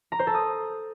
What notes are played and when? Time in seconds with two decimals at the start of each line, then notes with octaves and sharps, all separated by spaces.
0.12 A#5
0.19 C5
0.27 A4
0.34 D#6